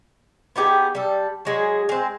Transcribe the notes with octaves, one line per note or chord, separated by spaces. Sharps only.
B3 D#4 G4 G#4
G3 A4
F#3 G#3 G#4
G#3 C4